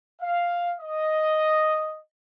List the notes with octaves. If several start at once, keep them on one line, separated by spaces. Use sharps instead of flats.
F5
D#5